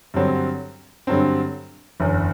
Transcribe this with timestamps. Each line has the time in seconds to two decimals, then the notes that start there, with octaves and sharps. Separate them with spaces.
0.14 G2 D3 F#3 C4
1.07 G2 D3 F#3 C4
2.00 F#1 E2 D3